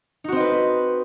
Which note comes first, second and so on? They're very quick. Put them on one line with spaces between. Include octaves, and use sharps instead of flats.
D#4 F#4 C4 D#5 B4